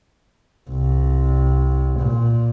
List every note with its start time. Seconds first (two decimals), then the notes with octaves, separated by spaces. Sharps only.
0.69 C2
1.99 A#2